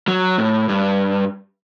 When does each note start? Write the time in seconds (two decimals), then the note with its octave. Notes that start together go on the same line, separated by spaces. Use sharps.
0.08 F#3
0.38 A2
0.69 G2